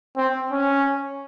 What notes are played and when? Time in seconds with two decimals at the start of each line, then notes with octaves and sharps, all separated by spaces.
0.17 C4
0.52 C#4